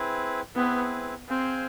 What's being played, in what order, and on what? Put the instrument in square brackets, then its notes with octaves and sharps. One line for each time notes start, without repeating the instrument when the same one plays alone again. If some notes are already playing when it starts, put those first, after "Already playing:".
Already playing: [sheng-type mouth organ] C4 E4 G#4 B4
[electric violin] B3 [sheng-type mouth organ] C4 E4 G#4 B4
[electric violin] C4 [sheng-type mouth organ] G#4 C5 F5 G#5